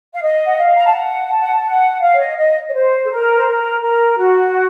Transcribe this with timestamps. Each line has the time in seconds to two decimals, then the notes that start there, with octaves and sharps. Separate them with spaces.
0.13 F5
0.22 D#5
0.46 F#5
0.57 F5
0.77 A#5
0.85 A5
0.93 F#5
1.30 A5
1.40 F#5
1.52 A5
1.65 F#5
2.01 F5
2.13 C#5
2.20 D#5
2.37 D#5
2.69 C#5
2.73 C5
3.05 A4
3.10 A#4
3.36 C5
3.46 A#4
3.81 A#4
4.17 F#4